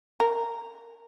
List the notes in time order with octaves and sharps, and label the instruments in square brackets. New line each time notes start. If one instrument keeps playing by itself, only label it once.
[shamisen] A#4